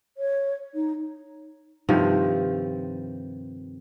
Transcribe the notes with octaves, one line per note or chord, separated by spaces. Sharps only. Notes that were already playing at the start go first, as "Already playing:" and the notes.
C#5
D#4
G2 C3 D#3 F3